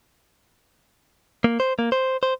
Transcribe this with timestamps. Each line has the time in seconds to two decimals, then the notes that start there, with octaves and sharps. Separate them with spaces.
1.44 A#3
1.60 C5
1.79 A#3
1.92 C5
2.23 C5